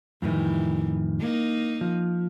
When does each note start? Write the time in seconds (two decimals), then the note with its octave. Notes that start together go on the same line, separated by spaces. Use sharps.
0.22 F2 A2 D#3 E3 G3
1.20 A#3 D#4
1.81 F3